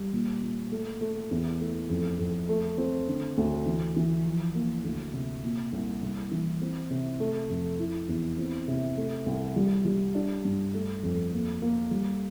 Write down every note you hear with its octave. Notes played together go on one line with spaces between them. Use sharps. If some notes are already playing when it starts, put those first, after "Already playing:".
Already playing: G3
A#2
A#2
A3
A3
E2
A3
F2
F2
A3
C4
D3
D2
E3
E3
F3
A#3
D2
C3
A#2
C2
C2
E3
C4
C3
A3
F2
E4
E2
C4
C3
A3
C2
G3
G3
D4
G2
A3
F2
A#3
A#3
G3